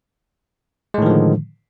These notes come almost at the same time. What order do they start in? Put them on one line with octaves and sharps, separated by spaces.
G#3 A2 D#3 F3 D3